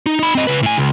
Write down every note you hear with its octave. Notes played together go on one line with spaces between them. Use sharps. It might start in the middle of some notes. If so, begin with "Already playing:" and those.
D#4
D#4 B5
C4 D#5
C#3 B4
A2 G#5
C#2